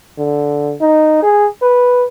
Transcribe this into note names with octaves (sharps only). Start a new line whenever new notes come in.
D3
D#4
G#4
B4